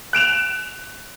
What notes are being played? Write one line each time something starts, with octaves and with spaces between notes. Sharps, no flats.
F#6 D7 E7 F7